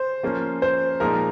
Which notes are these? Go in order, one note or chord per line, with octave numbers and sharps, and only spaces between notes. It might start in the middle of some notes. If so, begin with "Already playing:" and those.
Already playing: C5
F3 A#3 C#4
C5
A#2 F3 G#3 D#4 A#4